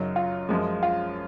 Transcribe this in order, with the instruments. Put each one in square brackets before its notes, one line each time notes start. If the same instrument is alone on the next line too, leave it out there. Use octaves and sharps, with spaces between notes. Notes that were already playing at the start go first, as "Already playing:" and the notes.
Already playing: [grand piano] F#2 C#3 F#3 D#4
F4
F#2 F3 G#3
F4